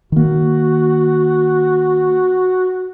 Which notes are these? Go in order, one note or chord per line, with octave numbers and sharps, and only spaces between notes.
D#3 A#3 F#4